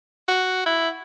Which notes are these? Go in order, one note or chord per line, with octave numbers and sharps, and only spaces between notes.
F#4
E4